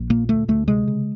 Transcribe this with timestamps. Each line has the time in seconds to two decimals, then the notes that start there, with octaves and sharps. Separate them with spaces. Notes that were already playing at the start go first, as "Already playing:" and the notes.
Already playing: A#1
0.10 A#2 A#3
0.29 D2 A3
0.48 D2 A3
0.68 C3 G#3
0.88 C#3